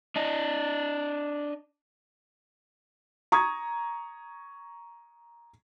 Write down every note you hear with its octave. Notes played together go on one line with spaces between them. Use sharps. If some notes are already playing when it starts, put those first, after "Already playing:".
D4 D#5
A#5 C#6 D#6 G#6